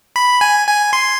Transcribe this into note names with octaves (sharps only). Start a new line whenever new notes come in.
B5
G#5
G#5
C6